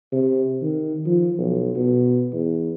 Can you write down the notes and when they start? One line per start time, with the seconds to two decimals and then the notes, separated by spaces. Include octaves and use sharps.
0.12 C3
0.62 D#3
1.06 F3
1.38 B1
1.76 B2
2.33 E2